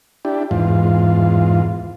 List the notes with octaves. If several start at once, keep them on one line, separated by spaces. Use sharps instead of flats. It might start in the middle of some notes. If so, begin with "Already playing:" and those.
D4 E4 G4
E2 G#2 F4